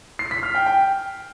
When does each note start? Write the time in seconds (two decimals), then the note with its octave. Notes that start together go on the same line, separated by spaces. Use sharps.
0.19 C7
0.31 B6
0.43 F6
0.55 G5
0.66 G5